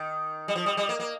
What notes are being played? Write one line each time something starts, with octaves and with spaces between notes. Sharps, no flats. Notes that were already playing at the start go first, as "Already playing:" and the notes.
Already playing: D#3
G3
F3
G3
G3
A#3
A#3